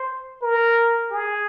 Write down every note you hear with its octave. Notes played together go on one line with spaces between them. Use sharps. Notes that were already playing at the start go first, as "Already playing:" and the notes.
Already playing: C5
A#4
G#4